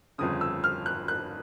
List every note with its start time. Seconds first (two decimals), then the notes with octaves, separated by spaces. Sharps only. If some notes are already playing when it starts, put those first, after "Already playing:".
0.18 G1 F2 C#3 D#6
0.41 E6
0.64 F6
0.86 F#6
1.08 F#6